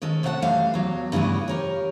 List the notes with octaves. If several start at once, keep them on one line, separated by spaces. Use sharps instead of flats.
D#3 G#3 C#4 A4
C3 A3 C#4 F5 F#5 A5
F#2 E3 G3 A3 F5
E2 F#3
G2 C#3 E3 A3 B3
G4 A#4 C#5